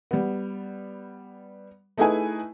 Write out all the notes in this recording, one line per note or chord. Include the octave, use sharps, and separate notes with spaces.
G3 B3
A3 D#4 E4 G#4 B4 G#5